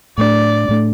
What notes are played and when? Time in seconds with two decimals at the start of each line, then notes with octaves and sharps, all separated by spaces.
0.18 A2 A3 D4 D5
0.69 A2 A3 D4